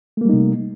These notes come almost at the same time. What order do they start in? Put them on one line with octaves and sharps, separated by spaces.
A3 A#3 G3 D#4 C3